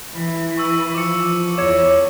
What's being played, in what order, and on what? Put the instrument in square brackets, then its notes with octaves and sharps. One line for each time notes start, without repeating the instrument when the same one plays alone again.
[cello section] E3
[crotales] C#6 E6
[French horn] F3 [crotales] D6 C#7
[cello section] E2 [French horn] C#5 [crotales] D6 G#6 C#7